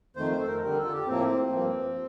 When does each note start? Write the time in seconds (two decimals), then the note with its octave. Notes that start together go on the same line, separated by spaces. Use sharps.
0.16 F2 D#3 A3 C5
0.31 C5
0.41 A4
0.47 A#4
0.62 F2 D3 G3 A#4
0.77 A4
0.84 F4
0.92 G4
1.07 A2 F3 A#3 C4
1.52 G2 F3 A#3